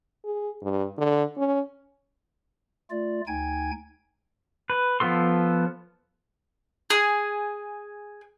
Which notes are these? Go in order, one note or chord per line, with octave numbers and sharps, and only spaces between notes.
G#4
G2
D3
C#4
A3 F4 D5
D2 D#4 G5 G#5 G#6
B4
F3 B3 A4 C6
G#4